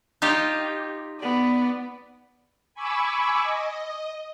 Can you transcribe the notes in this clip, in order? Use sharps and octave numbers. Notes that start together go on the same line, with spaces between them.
D#4 F4 G4
B3 D5
G#5 B5 C#6 D6 E6
D#5